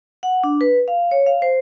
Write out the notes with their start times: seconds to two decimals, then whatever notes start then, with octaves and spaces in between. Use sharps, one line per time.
0.23 F#5
0.44 D4
0.61 B4
0.88 F5
1.11 C#5
1.26 F5
1.42 C5